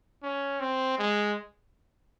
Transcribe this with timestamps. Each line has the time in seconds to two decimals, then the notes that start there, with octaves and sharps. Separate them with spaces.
0.23 C#4
0.60 C4
0.98 G#3